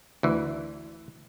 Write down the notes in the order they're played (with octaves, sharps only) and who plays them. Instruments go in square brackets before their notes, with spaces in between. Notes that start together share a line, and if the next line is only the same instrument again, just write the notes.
[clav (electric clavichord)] D2 E3